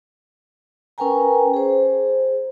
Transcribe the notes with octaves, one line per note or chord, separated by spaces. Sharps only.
C#4 A#4 B4 G5 G#5 A#5
G#4 C5